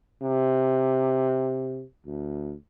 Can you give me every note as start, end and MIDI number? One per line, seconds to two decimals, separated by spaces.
0.22 1.82 48
2.06 2.54 38